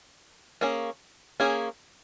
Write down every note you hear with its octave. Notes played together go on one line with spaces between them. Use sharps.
A#3 C#4 G#4
A#3 C#4 G#4